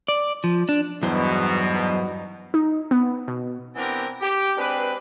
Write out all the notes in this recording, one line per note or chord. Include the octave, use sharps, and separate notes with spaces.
D5
F3
D4
E2 G2 B2 F#3 D#4 E4 C5
D#4
B3
B2
E3 B3 C4 D4 G4 A#4
G4
G#3 C4 D4 B4